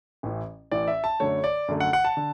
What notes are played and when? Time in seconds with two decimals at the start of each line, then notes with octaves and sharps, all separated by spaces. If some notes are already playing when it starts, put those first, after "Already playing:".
0.23 A1 A2 E3
0.71 A1 A2 E3 D5
0.88 E5
1.04 A5
1.20 F#2 D3 A3 C#5
1.44 D5
1.68 F#2 D3 A3
1.80 F#5
1.93 F#5
2.05 A5
2.17 D3